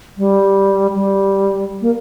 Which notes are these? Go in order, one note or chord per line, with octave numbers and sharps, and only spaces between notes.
G3
G3
A#3